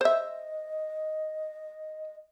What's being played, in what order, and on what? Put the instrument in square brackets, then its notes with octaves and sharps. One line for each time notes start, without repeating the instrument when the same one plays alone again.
[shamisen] C5 E5 [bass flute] D#5